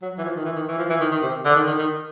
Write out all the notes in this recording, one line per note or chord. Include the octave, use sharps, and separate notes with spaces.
F#3
E3
F3
D#3
E3
D#3
E3
F3
E3
D#3
D#3
C3
D3
D#3
D#3
D#3